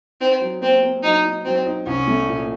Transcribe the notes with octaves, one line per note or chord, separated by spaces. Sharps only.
C4 D#4
F#3
A#3 C4
A#3
F#3 D#4
D#4
F#3 C4
D#4
C2 C#4
A3
A#2